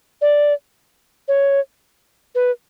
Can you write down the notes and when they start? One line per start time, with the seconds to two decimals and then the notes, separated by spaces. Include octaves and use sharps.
0.21 D5
1.28 C#5
2.35 B4